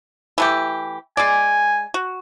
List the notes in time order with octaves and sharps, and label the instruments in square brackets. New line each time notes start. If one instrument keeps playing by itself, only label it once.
[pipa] E3 A3 G4
[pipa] G#3 D5 [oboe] G#5
[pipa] F#4